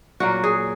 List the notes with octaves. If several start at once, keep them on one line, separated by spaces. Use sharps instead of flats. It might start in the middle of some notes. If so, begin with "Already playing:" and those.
A#2 F#3 A#3 F#4
G#4